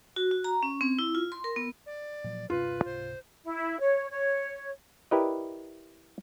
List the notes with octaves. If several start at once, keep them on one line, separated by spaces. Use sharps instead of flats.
F#4
F#4
A#5
C#4
C4
E4
F4
C6
A#4
B3
D5
A#2 F3 F#3
D#1 G2 C3 F4 B4
C#2 G#2 C3 C5
E4
C#5
C#5
E4 G4 A#4 B4 D5 D#5